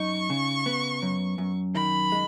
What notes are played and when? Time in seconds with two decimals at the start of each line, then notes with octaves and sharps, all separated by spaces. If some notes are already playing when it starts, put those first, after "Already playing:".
Already playing: F#2 D#4 C#6
0.30 C#3
0.66 B3
1.02 F#2
1.38 F#2
1.75 D#3 B5
2.12 G#3